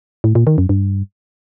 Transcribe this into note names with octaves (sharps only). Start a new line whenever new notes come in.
A2
A#2
D#3
F#2
G2